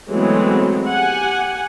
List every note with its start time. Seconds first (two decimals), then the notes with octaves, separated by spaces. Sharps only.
0.10 E3 F#3 G#3 A3 B3 C4
0.90 G4 F#5 G#5